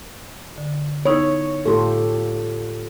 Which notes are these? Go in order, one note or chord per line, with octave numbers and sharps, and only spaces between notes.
D3
B3 D#4 E4 C#5
A2 A3 F4 G4 A4 C6